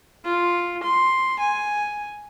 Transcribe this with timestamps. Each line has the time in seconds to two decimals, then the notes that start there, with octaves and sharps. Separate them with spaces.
0.24 F4
0.83 C6
1.40 G#5